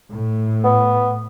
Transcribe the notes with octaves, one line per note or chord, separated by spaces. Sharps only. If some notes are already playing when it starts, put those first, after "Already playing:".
A2
B3